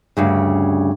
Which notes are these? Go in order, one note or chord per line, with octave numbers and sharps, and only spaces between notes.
D2 G2 C#3